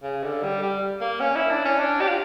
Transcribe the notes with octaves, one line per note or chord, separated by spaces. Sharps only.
C#3
D3
G3
G3
A#3
C#4
E4
D4
C#4
D4
G4
F4